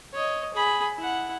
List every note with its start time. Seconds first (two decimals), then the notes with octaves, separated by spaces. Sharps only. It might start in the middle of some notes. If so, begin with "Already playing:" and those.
0.14 C#5 D#5
0.54 G#4 B5
0.97 E4 F#5